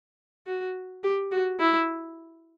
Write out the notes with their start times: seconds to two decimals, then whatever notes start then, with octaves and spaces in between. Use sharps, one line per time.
0.47 F#4
1.03 G4
1.31 F#4
1.59 E4